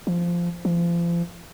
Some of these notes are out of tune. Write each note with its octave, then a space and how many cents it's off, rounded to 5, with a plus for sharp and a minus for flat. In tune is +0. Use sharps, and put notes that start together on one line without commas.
F3 -10
F3 -35